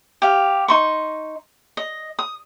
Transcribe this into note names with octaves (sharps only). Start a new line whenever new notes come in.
G4 F5
D#4 C6 C#6
D#5
D#6